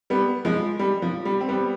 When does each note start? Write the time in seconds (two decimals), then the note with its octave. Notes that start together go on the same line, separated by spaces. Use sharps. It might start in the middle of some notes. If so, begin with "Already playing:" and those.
0.10 G3 B3
0.45 F3 G#3
0.79 G3
1.02 F3
1.25 G3
1.41 C4
1.48 G3 B3